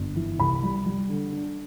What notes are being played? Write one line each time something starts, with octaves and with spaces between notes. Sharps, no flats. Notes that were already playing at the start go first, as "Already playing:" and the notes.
Already playing: G1
E3
C2 B5
G3
G3
D3
D4